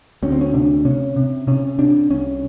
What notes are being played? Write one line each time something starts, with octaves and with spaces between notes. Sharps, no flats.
D2 C#4
C4
C#4
C3 D4
C3 C#4
C3
C3 C#4
C3 D4
C2 C#4